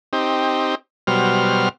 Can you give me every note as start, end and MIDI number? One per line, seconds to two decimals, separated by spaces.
0.13 0.75 60
0.13 0.75 63
0.13 0.75 67
1.07 1.69 47
1.07 1.69 54
1.07 1.69 55
1.07 1.69 72
1.07 1.69 89